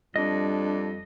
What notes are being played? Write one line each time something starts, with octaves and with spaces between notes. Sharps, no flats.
F2 G3 D4 D#5